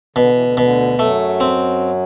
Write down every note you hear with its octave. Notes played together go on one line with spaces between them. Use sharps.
B2 D3
E3
D2 D3
D2 B2 D3
F#2 F#3 A3
C4